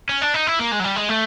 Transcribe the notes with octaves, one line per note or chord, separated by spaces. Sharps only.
C#4
D4
D#4
E4
A#3
G#3
F#3
G3
G#3
A3